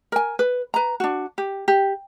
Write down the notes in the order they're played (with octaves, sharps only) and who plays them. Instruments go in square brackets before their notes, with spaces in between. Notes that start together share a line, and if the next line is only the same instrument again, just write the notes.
[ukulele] A#4 G#5
B4
B4 A#5
D4 F#4
G4
G4